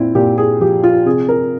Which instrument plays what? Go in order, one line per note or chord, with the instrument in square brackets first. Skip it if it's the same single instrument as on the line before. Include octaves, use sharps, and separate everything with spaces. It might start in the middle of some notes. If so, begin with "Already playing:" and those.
Already playing: [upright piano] A#2 C4 E4
A#2 G4
G#4
F3 G4
F4
C3 G#4
A#4